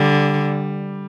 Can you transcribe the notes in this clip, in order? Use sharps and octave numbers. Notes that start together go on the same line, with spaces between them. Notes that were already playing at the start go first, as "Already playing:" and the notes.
Already playing: D3 G3